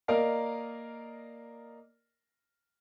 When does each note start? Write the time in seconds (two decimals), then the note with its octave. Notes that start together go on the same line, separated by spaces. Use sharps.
0.08 A#3 A#4 D5 D#5 F5